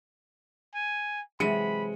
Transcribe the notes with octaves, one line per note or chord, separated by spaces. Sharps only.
G#5
C3 E3 F#3 G#3 B5 C#7 D#7